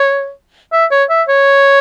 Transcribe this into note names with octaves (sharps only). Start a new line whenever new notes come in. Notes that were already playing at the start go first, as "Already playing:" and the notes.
Already playing: C#5
E5
C#5
E5
C#5